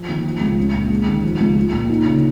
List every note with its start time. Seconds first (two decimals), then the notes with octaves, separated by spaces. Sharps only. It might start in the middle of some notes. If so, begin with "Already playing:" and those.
Already playing: F3
0.08 D#2
0.25 F3
0.41 C#2
0.58 C#4
0.74 A#2
0.90 G#3
1.06 D#2
1.23 F3
1.40 C#2
1.56 F4
1.73 A#2
1.90 D#4
2.06 C#3